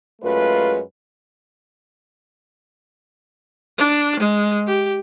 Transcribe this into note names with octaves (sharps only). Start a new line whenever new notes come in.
F#2 G#3 A3 F4 B4
D4
G#3
G4